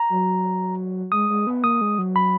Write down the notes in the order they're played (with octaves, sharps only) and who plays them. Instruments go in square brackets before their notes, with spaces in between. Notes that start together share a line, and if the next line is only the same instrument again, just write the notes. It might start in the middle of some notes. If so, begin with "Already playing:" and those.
Already playing: [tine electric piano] A#5
[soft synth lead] F#3
[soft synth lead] G#3 [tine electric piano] D#6
[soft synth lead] G#3
B3
[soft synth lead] A#3 [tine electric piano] D#6
[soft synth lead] G#3
F#3
[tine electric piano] B5